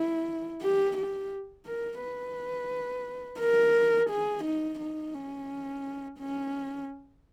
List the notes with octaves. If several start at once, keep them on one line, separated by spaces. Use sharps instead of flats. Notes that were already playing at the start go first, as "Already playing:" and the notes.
Already playing: E4
G4
G4
A#4
B4
A#4
G#4
D#4
D#4
C#4
C#4